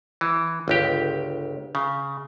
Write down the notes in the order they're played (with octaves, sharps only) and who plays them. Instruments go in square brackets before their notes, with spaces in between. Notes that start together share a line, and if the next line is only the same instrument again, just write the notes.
[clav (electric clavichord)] E3
G1 C#2 G4
C#3